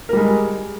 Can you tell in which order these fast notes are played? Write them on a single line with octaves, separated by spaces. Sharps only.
A#4 G3 G#3